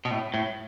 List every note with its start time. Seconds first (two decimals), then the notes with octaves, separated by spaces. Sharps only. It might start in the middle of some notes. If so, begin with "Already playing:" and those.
0.05 B2
0.11 A2
0.34 A2